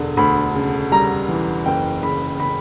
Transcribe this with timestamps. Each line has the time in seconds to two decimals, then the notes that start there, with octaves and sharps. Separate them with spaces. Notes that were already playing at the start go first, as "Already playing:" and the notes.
Already playing: E1 D3
0.17 D2 B5
0.54 C#3
0.92 G3 A#5
1.28 E3
1.66 F#1 G5
2.02 C#3 B5
2.40 C#3 B5